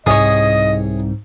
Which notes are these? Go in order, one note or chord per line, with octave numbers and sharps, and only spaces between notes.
C2 G#2 C3 G#4 C#5 D#5